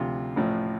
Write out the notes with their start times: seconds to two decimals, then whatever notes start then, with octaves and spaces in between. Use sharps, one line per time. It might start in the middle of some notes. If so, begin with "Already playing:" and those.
Already playing: D2 C3 F3 F4
0.36 A1 A2 F3